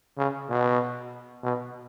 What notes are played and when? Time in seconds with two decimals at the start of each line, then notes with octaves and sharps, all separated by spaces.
0.17 C#3
0.49 B2
1.43 B2